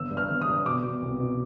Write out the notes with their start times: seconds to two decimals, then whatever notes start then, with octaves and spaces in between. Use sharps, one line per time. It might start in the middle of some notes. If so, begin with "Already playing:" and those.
Already playing: G1 E6
0.11 G2
0.17 F6
0.30 G1
0.42 D#6
0.47 G2
0.66 B2 D6
0.83 B2
1.02 C2
1.19 B2